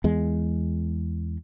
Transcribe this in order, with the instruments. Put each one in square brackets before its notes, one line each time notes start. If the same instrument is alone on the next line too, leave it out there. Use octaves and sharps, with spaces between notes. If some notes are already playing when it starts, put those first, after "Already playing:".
[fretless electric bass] E2 G#3